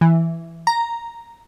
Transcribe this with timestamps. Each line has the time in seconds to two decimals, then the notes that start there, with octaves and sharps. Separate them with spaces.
0.01 E3
0.67 A#5